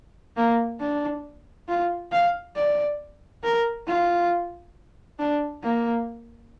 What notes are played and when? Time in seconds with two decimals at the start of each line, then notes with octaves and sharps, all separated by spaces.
0.37 A#3
0.80 D4
1.69 F4
2.12 F5
2.56 D5
3.44 A#4
3.88 F4
5.19 D4
5.63 A#3